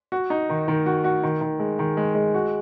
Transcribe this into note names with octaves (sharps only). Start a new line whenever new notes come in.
F#4
D#4
D#3
D#3
F#4
F#4
D#3
D#3
G#3
D#3
G#3
G#3
F#4